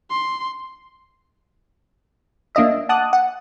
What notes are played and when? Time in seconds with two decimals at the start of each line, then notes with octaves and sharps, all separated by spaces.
0.11 C6
2.55 A#3 D4 F4 D#5 E5
2.89 F#5 A5 D6 D#6 F#6
3.13 F#5